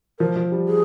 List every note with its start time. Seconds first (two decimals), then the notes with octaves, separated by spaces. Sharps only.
0.19 F3 A#4
0.36 F3
0.52 G3
0.68 G#4